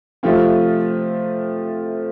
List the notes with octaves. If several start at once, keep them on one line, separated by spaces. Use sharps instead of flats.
C3 F3 A3 C4 F4